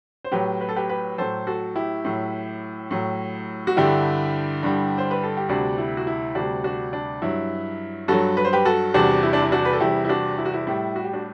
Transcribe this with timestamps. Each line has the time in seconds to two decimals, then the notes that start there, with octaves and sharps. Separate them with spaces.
0.24 C5
0.32 A2 F#3 G4 B4
0.61 B4
0.69 A4
0.76 G4 B4
0.89 G4 B4
1.18 A2 F#3 A4 C5
1.47 F#4 A4
1.76 E4 G4
2.05 A2 F#3
2.91 A2 F#3
3.67 F#4
3.76 G2 D3 G3 E4 G4
4.63 G2 D3 G3
4.98 C5
5.11 B4
5.24 A4
5.37 G4
5.49 D2 C3 G3 D4 F#4
5.78 E4
5.97 F#4
6.07 E4
6.35 D2 C3 G3 D4 F#4
6.64 D4 F#4
6.93 D4
7.22 G2 F#3 E4
8.08 G2 F#3 F#4 A4
8.37 B4
8.45 C5
8.53 G4 B4
8.65 F#4 A4
8.94 E2 C3 G3 D4 F#4
9.23 E4
9.33 D4
9.42 E4
9.52 D4 F#4
9.65 B4
9.73 A4
9.80 E2 C3 G3 E4 G4
10.05 E4
10.09 D4 F#4
10.38 E4
10.45 F#4
10.54 E4
10.67 A2 G3 E4
10.96 F#4
11.04 G4
11.13 D4 F#4